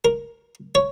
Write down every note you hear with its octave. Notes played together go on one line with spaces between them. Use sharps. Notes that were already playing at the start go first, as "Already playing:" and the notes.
A#4
C#5